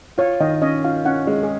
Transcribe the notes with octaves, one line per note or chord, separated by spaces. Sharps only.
F4 C#5
D#3 D#5
C#4 D#5
F4 F5
C#4 F#5
G#3
G#4